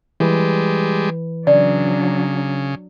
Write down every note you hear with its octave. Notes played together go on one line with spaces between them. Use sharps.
E3 G3 G#3 B4
C#3 F#3 D4 D5